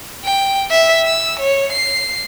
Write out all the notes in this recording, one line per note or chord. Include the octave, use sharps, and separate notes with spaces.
G5
E5
E6
C#5
C7